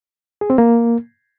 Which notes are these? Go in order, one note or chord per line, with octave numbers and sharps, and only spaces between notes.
G#4
C4
A#3